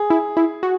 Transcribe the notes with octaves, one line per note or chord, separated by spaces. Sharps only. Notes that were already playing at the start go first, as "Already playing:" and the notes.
Already playing: G#4
E4
E4
F#4